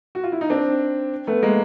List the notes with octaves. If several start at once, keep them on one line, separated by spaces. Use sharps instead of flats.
F#4
F4
E4
D#4
C4 D4
A3 B3
G#3 A#3